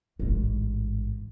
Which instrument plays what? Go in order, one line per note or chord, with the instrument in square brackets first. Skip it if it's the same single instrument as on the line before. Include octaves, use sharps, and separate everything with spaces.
[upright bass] A1 G#2